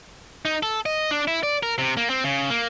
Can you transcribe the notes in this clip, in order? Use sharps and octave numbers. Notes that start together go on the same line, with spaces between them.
D#4
A4
D#5
D4
E4
D5
A#4
C3
A#3
C4
C#3
A#3